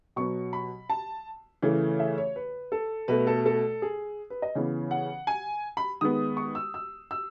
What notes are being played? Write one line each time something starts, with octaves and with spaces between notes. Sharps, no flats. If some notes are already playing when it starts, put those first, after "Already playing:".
B2 F#3 B3 C#6
B5
A5
C#3 E3 A3
E5
C#5
B4
A4
B2 A3 B4
A4
A4
G#4
B4
D#5
C#3 E3 B3
F#5
G#5
B5
D#3 G#3 B3 D#6
C#6
E6
E6
E6